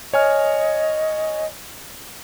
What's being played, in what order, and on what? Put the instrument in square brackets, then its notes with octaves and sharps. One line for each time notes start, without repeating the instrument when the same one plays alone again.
[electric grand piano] C#5 G#5 F6 [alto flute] D#5